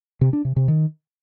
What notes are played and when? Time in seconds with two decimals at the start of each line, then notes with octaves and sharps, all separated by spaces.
0.21 C3
0.33 D4
0.45 C3
0.56 C3
0.68 D#3